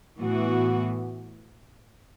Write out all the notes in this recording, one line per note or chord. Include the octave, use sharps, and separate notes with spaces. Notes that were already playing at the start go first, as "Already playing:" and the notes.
A2 E3 B3 F#4